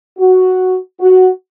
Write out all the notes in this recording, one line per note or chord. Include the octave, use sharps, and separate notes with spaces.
F#4
F#4